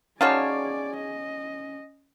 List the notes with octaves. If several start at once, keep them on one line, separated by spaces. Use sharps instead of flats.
C#4 D#4 F#4 G#4 C#5 D5 F5 A5
D#5